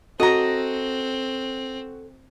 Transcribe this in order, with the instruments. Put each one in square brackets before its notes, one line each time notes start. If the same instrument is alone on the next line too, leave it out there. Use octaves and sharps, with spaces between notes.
[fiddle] C4 [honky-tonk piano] F#4 [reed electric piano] A4 [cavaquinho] D#5 A#5